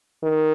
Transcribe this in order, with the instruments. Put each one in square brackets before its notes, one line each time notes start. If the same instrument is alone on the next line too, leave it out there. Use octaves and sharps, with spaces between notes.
[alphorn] D#3